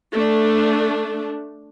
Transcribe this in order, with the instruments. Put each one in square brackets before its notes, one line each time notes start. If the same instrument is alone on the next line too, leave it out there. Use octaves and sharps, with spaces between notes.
[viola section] A3 D4